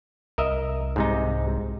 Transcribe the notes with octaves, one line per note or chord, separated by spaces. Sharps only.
C2 A#4 D#5 E5
C2 G#2 C3 D#4